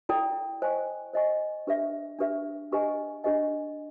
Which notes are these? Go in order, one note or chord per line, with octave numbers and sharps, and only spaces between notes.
E4 A4 D5 G5 A#5
C5 D#5 G#5 C#6
C5 D#5 G#5 C#6
D4 G4 B4 E5
D4 G4 B4 E5
D4 G4 B4 D#5 G#5
D4 G4 B4 D#5 G#5